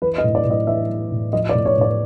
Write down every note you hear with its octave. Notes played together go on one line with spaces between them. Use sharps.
E3 B4
D#5
A2
D5
A2
D#5
E3 E5
E3
A2
F3 D#5
D5
A2
C#5
A2 D5